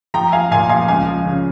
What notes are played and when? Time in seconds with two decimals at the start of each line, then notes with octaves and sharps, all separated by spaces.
0.14 F3 G5 A#5
0.32 F3 F5 G#5
0.51 A#2 F5 G#5
0.69 F3 F5 G#5
0.88 C#2 F5 G#5
1.07 F3
1.25 C#3